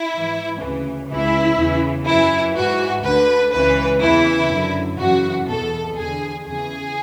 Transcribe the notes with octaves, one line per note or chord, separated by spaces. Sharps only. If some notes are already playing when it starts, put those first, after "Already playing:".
Already playing: E4
G#2 E3
D2 C#3 E3
C#2 C#3 E3 E4
E2 C#3 E3
F#2 E3 E4
G#2 E3 F#4
D2 D3 B4
C#2 C#3 E3 B4
E2 C#3 E3 E4
F#2 D3
F#2 C#3 E3 F#4
E2 B2 A4
E2 D3 G#4
E2 C#3 E3 G#4